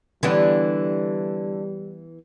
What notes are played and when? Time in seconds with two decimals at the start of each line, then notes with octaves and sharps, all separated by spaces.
0.23 D3 E3 G3 B3 D4 G4